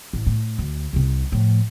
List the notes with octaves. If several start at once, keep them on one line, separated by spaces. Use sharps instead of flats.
A1
A2
D2
C2 C3
A2 F3